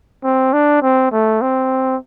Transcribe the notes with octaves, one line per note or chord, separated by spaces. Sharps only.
C4
D4
C4
A3
C4